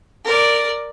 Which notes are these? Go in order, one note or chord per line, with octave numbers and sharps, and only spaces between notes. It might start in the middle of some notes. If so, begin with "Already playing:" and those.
A#4 D5